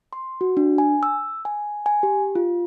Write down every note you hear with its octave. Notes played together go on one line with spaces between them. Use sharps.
C6
F#4
D4
G#5
E6
G#5
G#5
G4
F4